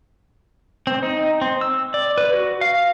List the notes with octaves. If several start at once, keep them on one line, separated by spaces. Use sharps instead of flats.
C4
D#4
C4
E6
D5
B4
F#4
F5